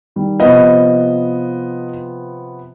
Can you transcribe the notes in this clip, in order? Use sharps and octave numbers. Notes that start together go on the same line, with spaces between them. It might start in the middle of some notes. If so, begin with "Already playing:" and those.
D#3 G3
C3 F3 B3 D#5